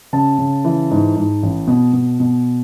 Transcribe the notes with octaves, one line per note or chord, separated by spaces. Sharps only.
C#3 A5
C#3
E3
G#2
G#2
A1
B2
B2
B2